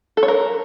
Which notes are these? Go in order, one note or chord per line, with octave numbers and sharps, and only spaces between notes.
A4
C#5
A#4